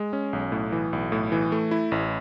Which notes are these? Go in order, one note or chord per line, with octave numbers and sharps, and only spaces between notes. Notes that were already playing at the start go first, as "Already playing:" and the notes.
Already playing: G#3
C#4
B1
A2
E3
B1
A2
E3
A3
E4
A1